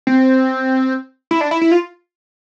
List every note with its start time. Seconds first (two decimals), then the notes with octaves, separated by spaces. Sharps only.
0.07 C4
1.31 E4
1.41 D4
1.51 E4
1.61 E4
1.71 F4